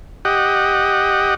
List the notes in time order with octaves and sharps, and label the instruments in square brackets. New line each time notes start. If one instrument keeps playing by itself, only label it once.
[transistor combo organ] G4 D#5 F#5